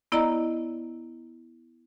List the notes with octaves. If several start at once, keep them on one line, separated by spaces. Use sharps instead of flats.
B3 E4 D5 D#5 A#5